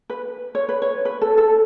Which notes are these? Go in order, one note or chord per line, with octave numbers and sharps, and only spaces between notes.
B4
C#5
B4
C#5
B4
A4
A4